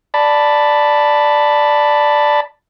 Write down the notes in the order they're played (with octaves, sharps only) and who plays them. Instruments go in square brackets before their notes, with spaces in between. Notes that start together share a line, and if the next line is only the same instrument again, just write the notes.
[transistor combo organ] D5 A5 B5